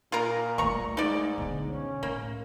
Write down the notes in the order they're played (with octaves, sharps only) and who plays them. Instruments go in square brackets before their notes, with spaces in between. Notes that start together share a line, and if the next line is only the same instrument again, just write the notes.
[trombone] A#2 [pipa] F4 A#4
[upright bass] G3 A3 [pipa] A#5 C#6
[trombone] G#2 [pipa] D#4 D5
[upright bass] B2 D3
[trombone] C#4
[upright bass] A2 [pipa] A#3